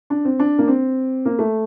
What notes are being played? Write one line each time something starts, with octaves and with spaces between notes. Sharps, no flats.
D4
C4
D4
A#3
C4
A#3
A3